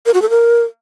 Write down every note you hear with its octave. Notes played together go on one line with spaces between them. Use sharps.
A#4
F#4
A4
A#4